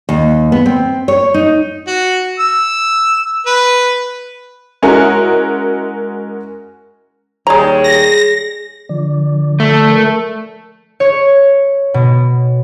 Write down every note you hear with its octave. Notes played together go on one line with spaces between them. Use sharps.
D#2
B3
C4
C#5
D#4
F#4
E6
B4
G#3 C#4 E4 F#4 A#4
D#2 G3 G#3 G#4 C#5 A#5
A#6
D3 F3 D5
A3
A#4
C#5
B2